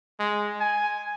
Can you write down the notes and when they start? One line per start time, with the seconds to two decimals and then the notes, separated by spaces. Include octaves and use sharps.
0.20 G#3
0.60 G#5